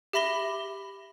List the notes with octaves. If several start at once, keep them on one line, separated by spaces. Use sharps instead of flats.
G4 E5 B5 A#6 G7